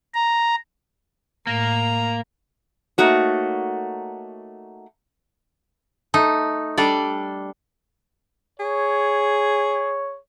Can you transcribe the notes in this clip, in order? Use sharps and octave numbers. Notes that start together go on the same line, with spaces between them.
A#5
A2 A#3 A#5
A3 A#3 D#4 F#4 C#5
A3 D#4
G3 D4 A4 D5
G#4 C#5